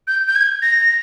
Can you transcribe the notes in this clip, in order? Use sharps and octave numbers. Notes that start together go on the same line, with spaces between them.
G6
G6
G#6
A#6